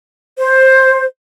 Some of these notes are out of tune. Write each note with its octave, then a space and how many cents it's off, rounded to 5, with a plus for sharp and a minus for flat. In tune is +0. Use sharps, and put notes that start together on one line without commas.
C5 +10